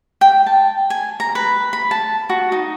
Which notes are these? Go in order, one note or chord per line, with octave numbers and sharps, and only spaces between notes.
G5
A5
G#5
A#5
B4
B5
A5
F#4
D#4